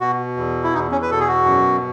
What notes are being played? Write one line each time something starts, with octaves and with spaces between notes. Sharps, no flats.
B2 F#4
E2
E4
E2 D#4
C#4
B4
B2 A4
G#4
F#4
F#2